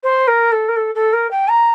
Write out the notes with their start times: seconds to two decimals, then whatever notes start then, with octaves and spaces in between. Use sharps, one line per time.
0.03 C5
0.28 A#4
0.52 A4
0.69 A#4
0.76 A4
0.95 A4
1.13 A#4
1.31 G5
1.50 A#5